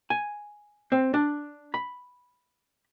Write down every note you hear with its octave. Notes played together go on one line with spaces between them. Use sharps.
G#5
C4
D4
B5